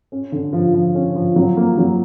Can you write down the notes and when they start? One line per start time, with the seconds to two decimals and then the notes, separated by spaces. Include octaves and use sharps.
0.12 C#4
0.32 D3
0.53 F3
0.74 F3
0.95 C#4
1.16 F3
1.36 F#3
1.57 A#3
1.78 F#3